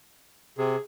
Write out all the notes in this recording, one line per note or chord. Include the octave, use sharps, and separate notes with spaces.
C3 G#4